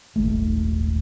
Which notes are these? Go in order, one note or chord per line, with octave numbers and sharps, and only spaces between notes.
D#1 G#1 A3